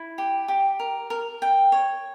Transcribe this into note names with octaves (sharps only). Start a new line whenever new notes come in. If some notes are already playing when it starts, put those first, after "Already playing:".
Already playing: E4
G4
G4
A#4
A#4
G5
C#5